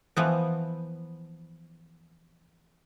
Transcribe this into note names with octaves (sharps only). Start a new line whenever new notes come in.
E3 F3 B3